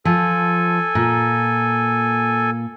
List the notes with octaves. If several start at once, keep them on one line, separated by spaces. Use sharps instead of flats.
F3 A4 G#5
A#2